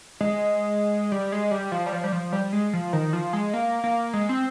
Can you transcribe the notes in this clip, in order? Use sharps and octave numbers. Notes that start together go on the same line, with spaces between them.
G#3
G3
G#3
G3
F3
G3
F3
G3
F3
G3
G#3
F3
D#3
F3
G#3
A#3
A#3
G#3
C4